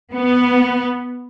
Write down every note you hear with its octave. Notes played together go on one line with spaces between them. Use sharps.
B3